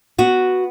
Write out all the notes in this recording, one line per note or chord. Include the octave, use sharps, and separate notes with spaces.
B3 F#4